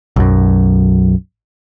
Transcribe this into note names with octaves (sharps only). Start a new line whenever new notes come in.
B1 F#2